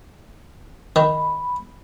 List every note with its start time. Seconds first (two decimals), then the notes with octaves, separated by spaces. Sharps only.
0.96 D#3 B5